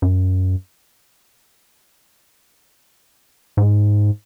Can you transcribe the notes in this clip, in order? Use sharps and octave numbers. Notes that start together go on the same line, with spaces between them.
F#2
G#2